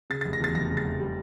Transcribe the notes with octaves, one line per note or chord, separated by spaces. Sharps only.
C#3 A6
A6
F1
A#6
E2 A6
F1 A#6
C#3
A6
F1
G3